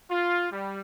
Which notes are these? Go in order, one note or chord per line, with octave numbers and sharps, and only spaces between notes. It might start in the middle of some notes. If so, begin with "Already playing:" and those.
F4
G3